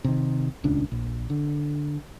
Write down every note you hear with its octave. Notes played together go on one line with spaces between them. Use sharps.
C3 D#3
D#1 C#2 C#4 D4
A#1
D3